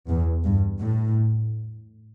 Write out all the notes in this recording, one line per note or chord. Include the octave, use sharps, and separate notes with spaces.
E2
G2
A2